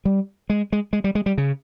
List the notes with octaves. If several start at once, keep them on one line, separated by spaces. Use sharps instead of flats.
G3
G#3
G#3
G#3
G3
G#3
G3
C#3